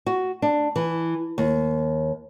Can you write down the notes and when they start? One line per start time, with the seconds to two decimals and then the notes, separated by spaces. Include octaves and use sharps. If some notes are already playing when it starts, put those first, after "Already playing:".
0.06 F#4
0.42 D4
0.76 E3
1.38 D#2